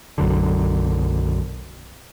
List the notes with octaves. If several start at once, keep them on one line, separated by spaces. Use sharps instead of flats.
B1 F#2 D3